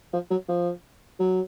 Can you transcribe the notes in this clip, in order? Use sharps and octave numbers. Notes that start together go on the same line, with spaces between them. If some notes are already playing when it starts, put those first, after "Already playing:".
F3
F#3
F3
F#3